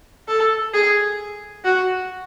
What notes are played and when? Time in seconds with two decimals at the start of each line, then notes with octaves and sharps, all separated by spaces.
0.28 A4
0.73 G#4
1.64 F#4